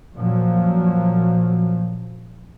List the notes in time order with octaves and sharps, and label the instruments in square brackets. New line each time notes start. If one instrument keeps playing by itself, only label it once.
[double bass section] F#2 A#2 F3 F#3